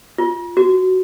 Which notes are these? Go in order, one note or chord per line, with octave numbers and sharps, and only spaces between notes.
F4
F#4